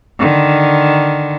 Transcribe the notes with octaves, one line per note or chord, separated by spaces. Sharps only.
D3 D#3